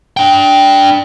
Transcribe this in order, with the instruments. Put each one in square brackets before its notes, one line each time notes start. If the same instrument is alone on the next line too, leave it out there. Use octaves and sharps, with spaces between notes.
[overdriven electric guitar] D4 G5